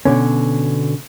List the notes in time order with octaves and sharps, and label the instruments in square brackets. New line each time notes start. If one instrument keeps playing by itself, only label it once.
[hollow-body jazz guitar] B2 D3 C#4